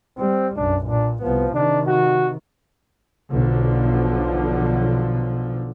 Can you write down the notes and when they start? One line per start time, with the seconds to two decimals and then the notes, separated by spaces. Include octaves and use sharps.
0.18 G3 C4
0.56 B1 F#2 D4
0.87 A#2 D4
1.23 C2 F3 B3
1.54 C3 D#3 D4
1.88 F#4
3.31 B1 D3 F3